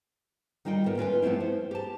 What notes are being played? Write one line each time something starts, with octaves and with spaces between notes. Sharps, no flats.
D#3 G3 D#4 F4 G5
A2 B3 A#4 E5
C#4 F4 B4 G5
F3 A3 B3 C4 E4
C5
G4 A5